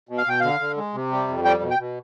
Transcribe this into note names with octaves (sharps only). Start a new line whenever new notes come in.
B2
F5
B2 G5
D3 F5
D3
G#3
C3
G3
F2
G3 G5
B2
G5
B2